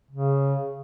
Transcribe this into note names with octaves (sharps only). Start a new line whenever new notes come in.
C#3